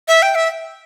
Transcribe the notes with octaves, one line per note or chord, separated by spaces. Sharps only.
E5
G5
E5